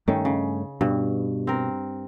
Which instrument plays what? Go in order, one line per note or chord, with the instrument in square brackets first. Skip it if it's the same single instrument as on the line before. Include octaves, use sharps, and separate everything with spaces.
[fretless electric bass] G2 A3 C#4 [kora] D#3
[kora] C#3
[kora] G2 [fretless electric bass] B2
[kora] C4 A#4